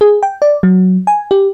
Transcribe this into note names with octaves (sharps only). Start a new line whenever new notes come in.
G#4
G5
D5
F#3
G#5
G4